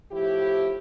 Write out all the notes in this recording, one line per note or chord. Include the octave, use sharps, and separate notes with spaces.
A2 F3 E4 G4